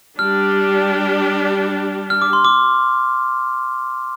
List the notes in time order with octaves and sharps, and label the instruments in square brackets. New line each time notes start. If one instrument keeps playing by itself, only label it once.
[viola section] G3 D4 G4 [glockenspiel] F6
[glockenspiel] F6
D6
C6
D6